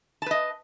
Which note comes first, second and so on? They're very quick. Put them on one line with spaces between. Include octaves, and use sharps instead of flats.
A5 B4 D#5